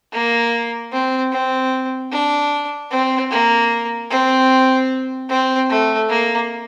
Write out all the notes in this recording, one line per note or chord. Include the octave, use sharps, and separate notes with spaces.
A#3
C4
C4
D4
C4
A#3
C4
C4
A3
A#3